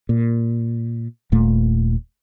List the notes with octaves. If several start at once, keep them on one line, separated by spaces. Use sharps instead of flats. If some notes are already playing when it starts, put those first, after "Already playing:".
A#2
D#1 A#2 A3